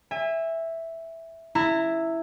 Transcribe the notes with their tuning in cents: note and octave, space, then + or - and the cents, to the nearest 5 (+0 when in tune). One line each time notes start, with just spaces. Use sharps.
E5 +0 G#5 -35
E4 +0 A#5 -30